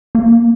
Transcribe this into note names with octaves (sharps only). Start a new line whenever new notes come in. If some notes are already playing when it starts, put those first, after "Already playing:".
A#3